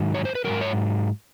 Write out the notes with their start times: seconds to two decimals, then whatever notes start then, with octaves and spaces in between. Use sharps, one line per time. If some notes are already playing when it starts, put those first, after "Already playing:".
Already playing: G#2 D#3 F#3
0.15 C#5
0.25 C5
0.35 B4
0.44 G#2 D#3 F#3 A#4
0.61 C#5